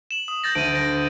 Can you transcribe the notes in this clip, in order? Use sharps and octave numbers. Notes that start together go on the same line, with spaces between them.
E7 F#7
D#6
G6 A6 A#6
D2 D7 D#7
A#6